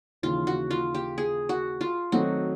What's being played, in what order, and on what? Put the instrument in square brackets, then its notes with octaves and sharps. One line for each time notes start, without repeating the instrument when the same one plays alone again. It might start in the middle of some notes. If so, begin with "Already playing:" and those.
[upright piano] D#2 C#3 E3 [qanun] F4
[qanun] F#4
F4
G4
G#4
F#4
F4
[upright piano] D#3 F#3 A3 C4 D#4 [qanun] F#4